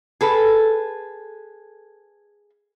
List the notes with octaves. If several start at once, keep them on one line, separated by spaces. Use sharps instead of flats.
G#4 A4 B4